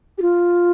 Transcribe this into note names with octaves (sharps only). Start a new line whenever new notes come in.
G4
F4